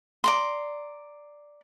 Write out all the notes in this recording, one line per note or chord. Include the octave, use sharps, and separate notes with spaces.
D5 A#5 C6